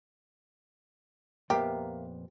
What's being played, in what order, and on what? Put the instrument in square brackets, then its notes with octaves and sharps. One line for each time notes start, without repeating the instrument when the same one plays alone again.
[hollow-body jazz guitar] F2 A#2 B3 [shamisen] G4 [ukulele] A#4 E5 F5